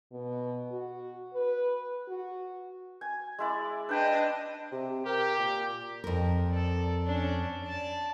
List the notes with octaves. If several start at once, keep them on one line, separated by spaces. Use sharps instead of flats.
B2
F#4
B4
F#4
G#5
G#3 E4 D5
D4 B4 D#5 G5 B5
C3
G4 A#4
A#2
F2 A#4
A4 D5
C#4 D4
D5 A5